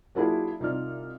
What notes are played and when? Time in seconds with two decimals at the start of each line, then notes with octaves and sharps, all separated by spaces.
0.15 F#3 A#3 D4 E4 F4 G#4
0.60 C2 D#4 F4 D5 F6